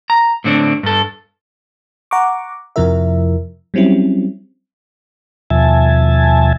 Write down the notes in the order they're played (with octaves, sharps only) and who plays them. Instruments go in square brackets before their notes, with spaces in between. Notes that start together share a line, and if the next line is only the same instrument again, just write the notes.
[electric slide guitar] A#5
A2 D3 C4 D4
G2 A4
[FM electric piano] F#5 A#5 C#6 D6
F2 C3 F3 E4 A#4 E5
F#3 G3 C4 C#4 E4
[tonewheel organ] D#2 B2 F3 E5 G#5 A5